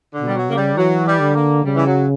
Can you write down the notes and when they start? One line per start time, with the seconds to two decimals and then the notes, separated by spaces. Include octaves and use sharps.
0.13 D3
0.20 B2
0.27 G3
0.35 F#3
0.48 C#3 A#3
0.55 G3
0.77 E3 F#3
1.06 G3
1.21 D3
1.35 A#3
1.64 C#3 G3
1.75 E3
1.86 F#3